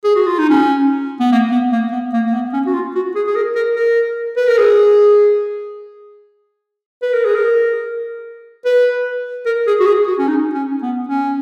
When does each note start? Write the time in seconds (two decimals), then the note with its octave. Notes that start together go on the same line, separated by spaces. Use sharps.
0.04 G#4
0.16 F#4
0.27 F4
0.39 D#4
0.50 C#4
1.20 B3
1.32 A#3
1.52 B3
1.72 A#3
1.92 B3
2.13 A#3
2.27 A#3
2.34 B3
2.53 C#4
2.66 F#4
2.73 F4
2.95 F#4
3.15 G#4
3.27 G#4
3.36 A#4
3.55 A#4
3.76 A#4
4.37 B4
4.47 A#4
4.58 G#4
7.02 B4
7.13 A#4
7.25 G#4
7.35 A#4
8.65 B4
9.46 A#4
9.67 G#4
9.80 F#4
9.86 G#4
10.07 F#4
10.18 C#4
10.27 D#4
10.54 C#4
10.82 B3
11.08 C#4